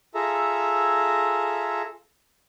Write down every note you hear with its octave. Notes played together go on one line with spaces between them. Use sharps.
F4 G#4 A4 E5 A#5